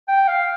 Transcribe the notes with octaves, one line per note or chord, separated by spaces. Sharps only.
G5
F5